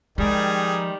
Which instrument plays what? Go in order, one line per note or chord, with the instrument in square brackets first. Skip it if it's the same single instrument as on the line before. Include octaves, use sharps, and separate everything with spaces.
[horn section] D#3 G3 [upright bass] F3 G#3 [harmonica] G#4